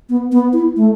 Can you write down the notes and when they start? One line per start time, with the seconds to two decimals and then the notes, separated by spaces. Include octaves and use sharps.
0.09 B3
0.32 B3
0.53 E4
0.76 A3